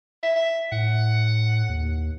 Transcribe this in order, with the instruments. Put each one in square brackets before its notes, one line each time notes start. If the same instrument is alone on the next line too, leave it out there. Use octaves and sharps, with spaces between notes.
[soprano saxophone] E5
E5
[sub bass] A2 [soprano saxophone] F#5
[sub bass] D#2